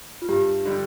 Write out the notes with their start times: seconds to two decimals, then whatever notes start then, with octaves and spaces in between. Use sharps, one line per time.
0.22 F4
0.29 G2 G4
0.65 D3 G3